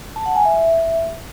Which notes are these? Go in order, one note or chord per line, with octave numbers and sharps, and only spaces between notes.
A5
F#5
G#5
E5